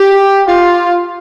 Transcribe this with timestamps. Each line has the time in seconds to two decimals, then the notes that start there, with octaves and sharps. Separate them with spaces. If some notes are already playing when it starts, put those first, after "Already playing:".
Already playing: G4
0.47 F4